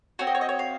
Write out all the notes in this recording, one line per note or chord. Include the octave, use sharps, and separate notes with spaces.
C4 F#4 C#5
D#5
C#5
D#5
C#5
F5